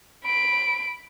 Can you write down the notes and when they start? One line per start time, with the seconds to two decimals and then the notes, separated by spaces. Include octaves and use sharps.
0.24 B5 D7